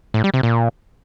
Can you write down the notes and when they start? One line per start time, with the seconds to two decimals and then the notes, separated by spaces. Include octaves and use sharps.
0.14 A2
0.24 G3
0.34 C3
0.43 A#2